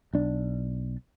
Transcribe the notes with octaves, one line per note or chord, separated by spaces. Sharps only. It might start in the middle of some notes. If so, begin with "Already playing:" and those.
B1 D4